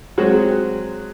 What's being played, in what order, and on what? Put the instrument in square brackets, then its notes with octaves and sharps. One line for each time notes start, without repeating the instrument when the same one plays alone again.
[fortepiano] F#3 G#3 C4 F#4